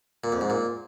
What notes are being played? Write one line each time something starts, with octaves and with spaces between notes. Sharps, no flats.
A#2
F2
G#2
A#2